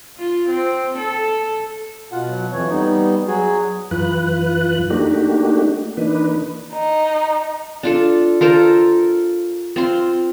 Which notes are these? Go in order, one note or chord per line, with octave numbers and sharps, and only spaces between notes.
F4
C4
A4
B2 F4 F#5
F#3
F2 E3 C#5
G3 B3 D#4
F#3 F#4 G#4
F#2 E3 F4 B4 F#6
A3 A#3 D4 D#4 F#4 G4
E3 A#3 D4 D#4 B4
D#4
D4 F4 A4
F4 A4 A#4 C5
C4 F4 C6